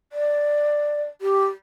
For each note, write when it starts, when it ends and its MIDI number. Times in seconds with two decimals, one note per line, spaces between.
0.12 1.03 74
1.21 1.46 67